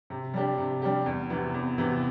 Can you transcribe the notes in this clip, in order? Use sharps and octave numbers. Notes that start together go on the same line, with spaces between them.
C3
G3 D4 G4
C3
G3 D4 G4
E2
C3 E3 B3
E2
C3 E3 B3